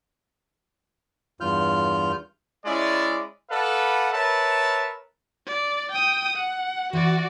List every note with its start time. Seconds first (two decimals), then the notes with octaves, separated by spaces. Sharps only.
1.41 E2 G2 F4 F6 G6
2.65 G#3 C#4 E4 D5
3.50 A4 B4 D5 F5 F#5
4.13 A#4 B4 C#5 E5 A5
5.47 D5
5.92 G5 D#6
6.36 F#5
6.93 E3 F#4 D5 E5